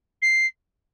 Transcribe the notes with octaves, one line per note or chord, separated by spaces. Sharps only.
C7